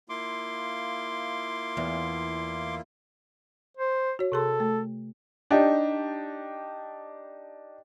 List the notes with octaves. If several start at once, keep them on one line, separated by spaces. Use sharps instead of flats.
A#3 E4 F4 C6 D6
E2
C5
F#4 C#5
C3 G#4 A4 C6
A3
D4 D#4 G4